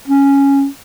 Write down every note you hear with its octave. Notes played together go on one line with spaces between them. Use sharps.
C#4